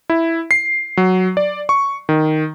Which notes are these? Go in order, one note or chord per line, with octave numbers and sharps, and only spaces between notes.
E4
C7
F#3
D5
C#6
D#3